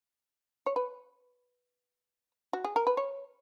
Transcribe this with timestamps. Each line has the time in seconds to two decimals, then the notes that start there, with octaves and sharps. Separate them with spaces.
0.66 C#5
0.76 B4
2.53 F#4
2.64 G#4
2.76 A#4
2.87 B4
2.97 C#5